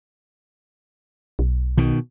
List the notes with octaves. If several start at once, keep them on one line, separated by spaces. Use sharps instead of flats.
B1
B2 D#3